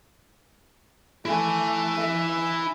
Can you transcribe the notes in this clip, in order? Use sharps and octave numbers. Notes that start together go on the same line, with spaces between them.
A3 E4 G#5
E5